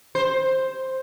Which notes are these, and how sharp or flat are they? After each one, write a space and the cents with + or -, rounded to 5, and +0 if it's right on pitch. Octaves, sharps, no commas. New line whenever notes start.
C5 +5